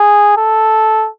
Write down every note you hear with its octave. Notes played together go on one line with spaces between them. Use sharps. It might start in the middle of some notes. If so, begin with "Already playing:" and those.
Already playing: G#4
A4